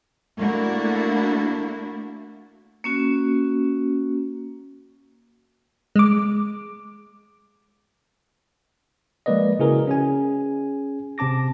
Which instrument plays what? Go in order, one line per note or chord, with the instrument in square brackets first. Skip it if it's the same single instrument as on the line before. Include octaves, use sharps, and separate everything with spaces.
[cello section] A3 A#3 D4 E4 F#4
[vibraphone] A#3 C#4 F#4
[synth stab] G#3 D6
[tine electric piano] F3 G#3 A#3 B4 D5 D#5
C#3 E4 F#4 G#4 A#4 B4
C#4 G#4 G#5
C3 C4 A5 D6 A#6